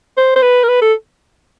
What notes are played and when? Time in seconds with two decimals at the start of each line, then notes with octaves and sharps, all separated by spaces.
0.17 C5
0.36 C5
0.42 B4
0.63 A#4
0.69 B4
0.82 A4